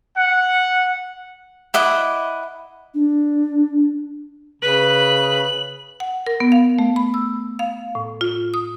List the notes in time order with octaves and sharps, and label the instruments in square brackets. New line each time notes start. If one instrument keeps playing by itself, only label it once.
[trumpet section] F#5
[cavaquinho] E4 D#5 F#5 D6
[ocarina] D4
[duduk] C#3 [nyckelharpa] B4 [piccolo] F#7
[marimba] F#5
A#4
B3
F5
A3
B5
E6
F5
A2
F4
D#6